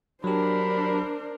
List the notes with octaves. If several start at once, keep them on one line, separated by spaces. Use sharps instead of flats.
F#3 D4 G4 A#4 C5 B5